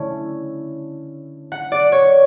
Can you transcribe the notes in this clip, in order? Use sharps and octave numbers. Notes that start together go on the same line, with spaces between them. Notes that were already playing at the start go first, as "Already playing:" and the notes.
Already playing: D3 A3 C#4 E4
F#5
D5
C#5